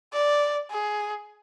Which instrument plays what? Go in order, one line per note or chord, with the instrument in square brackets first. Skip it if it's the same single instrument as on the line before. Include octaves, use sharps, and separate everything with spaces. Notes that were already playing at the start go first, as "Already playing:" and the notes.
[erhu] D5
G#4